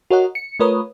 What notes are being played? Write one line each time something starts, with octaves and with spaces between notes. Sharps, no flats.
F#4 A#4 C#5 D#5 F#5
C#7
A3 F4 A#4 B4 C#5 D#6